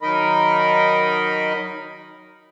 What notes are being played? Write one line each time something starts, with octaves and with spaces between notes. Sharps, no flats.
D#3 F#3 D#4 A#4 D#5 B5